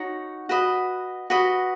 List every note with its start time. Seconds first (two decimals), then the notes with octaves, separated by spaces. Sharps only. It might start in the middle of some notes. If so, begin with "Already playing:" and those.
Already playing: D#4 F#4 C#5 F#5
0.49 F#4 B4 D#5
1.30 F#4 B4 D#5